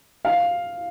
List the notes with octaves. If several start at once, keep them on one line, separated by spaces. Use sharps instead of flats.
F5